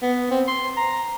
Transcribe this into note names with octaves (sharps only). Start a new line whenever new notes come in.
B3
C4
C6
A#5